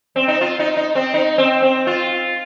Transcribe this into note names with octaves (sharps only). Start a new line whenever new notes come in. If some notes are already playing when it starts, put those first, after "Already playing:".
C4
D#4
F4
D#4
D#4
C4
D#4
C4
C4
F4